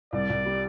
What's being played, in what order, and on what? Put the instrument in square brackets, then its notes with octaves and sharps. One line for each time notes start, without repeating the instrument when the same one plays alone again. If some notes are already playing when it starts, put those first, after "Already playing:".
[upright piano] C2 [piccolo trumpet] D5
[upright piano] C2
G3